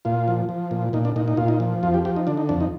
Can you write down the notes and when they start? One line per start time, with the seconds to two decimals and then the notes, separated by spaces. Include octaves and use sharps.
0.05 A#2 F4
0.28 F3
0.49 F3
0.71 A#2
0.93 A#2 D#4
1.05 D4
1.16 A#2 D#4
1.28 D#4
1.37 A#2 F4
1.48 D#4
1.60 F3
1.83 F2 F4
1.94 G4
2.05 F3 G4
2.16 D#4
2.27 D3 D4
2.37 D#4
2.49 F2 D4
2.60 D#4